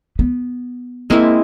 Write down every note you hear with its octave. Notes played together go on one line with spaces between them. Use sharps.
B3
G#3 A#3 C4 E4